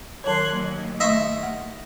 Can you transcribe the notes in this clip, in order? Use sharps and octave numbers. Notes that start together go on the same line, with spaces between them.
D#3 F#3 C#5 C6 F#6 G#6
D#2 F#3
A3 D#5 E5 C6 C#6
F#5